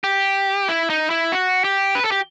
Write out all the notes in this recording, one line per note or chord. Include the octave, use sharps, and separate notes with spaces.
G4
E4
D#4
E4
F#4
G4
B4
A4
G4